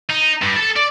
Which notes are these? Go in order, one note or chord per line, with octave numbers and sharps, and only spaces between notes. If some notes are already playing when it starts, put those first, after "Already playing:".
D#4
G2
A4 A5
D5